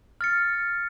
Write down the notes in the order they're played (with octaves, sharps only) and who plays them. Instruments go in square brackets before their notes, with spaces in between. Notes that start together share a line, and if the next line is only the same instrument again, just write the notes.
[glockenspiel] F6 A6 C#7